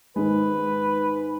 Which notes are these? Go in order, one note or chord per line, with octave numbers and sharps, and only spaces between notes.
G#2 D#3 G#3 B4